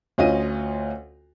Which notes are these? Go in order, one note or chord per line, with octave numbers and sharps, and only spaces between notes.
D2 C#4 F4 D#5 D#7